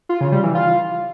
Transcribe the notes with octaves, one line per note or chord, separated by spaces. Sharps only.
F4
C#3
G3
E3
F4